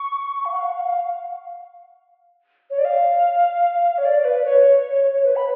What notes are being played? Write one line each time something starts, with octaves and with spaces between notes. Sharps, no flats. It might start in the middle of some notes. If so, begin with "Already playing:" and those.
Already playing: C#6
F5
F#5
F5
F#5
F5
F#5
F5
C#5
D5
F5
C#5
D5
B4
C#5
B4
B5